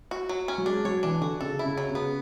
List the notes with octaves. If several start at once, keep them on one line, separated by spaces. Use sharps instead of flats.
F#4
F#3
C#4
F#3
G#3 D4
F#3 C#5
E3 D4
D3 F#4
C#3 A4
E4
C#3
F#3
C#3 B3